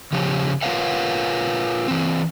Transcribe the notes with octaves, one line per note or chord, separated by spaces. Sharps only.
C#3 F3 G4 C#5
F4 A#4 B4 C#5 F5 F#5
E3 C4